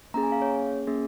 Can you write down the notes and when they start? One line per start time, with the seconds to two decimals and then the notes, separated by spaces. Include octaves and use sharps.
0.14 A#3 C#4 G#4 A#5
0.23 G#5
0.32 F5
0.42 C#5
0.87 A#3 C#4 G#4